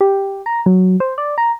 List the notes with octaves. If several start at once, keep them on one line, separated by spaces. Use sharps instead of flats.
G4
A#5
F#3
C5
D5
A#5